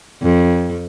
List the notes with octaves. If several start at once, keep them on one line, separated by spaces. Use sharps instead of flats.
F2